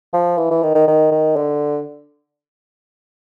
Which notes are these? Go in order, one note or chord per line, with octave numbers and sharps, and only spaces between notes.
F3
E3
E3
D#3
D#3
D#3
D#3
D3